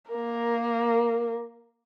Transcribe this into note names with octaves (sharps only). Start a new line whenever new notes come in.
A#3 A#4